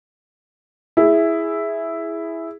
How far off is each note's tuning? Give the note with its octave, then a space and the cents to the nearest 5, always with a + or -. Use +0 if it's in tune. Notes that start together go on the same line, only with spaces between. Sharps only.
E4 +0 G#4 +0